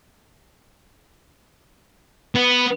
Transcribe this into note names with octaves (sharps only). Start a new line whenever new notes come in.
B3